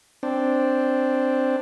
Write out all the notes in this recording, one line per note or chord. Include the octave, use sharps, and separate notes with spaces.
C4 D4